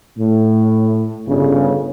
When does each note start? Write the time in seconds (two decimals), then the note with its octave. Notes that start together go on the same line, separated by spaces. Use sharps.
0.18 A2
1.28 G1 C#3